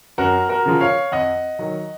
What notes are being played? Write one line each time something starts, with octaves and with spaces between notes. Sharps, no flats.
F#2 F#4 A#4
F#4 A#4
C#3 F3
C#5 F5
F2 D#5 F#5
D#3 F#3